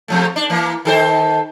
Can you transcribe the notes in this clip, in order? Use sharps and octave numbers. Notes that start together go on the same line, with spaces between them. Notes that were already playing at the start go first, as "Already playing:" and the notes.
B2 F3 A3
D4
E3 A#3
D#3 A4 C5